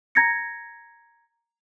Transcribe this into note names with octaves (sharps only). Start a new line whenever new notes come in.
A#5 G#6 A#6 C#7